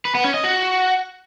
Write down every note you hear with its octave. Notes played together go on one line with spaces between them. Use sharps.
B4
B3
C#4
D#5
F#4